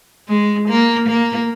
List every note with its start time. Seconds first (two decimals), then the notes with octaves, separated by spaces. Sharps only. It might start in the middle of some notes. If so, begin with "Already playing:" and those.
0.28 G#3
0.68 A#3
1.09 A#3